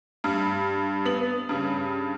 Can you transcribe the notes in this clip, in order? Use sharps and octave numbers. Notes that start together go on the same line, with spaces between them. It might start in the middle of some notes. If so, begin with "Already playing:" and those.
G2
B3 F#7
G2 C#3